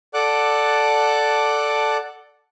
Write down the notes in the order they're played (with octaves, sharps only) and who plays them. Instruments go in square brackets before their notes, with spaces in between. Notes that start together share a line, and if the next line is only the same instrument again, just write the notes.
[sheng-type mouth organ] A4 D5 F#5 A5 D6 F#6